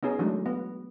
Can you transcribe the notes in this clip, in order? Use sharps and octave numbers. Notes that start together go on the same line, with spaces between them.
B3 C#4 D#4 G#4
E3 F#3 G#3 A3 D4 D#4
B3